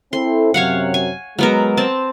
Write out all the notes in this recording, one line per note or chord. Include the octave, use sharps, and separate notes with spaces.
C4 E4 A4 C6
F#2 C3 F#3 C#5 F5 F#5
G#5
F#3 G#3 B3 A#4
C4 A5